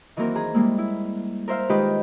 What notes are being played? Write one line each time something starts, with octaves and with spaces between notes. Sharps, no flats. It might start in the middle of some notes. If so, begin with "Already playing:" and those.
D#3 E3 F#3 A#3 C4 A#4
G#4 A#5
G3 G#3 A#3 E4
E4
A#4 C5 E5 F5
D#3 G#3 D#4 F4 G4 B4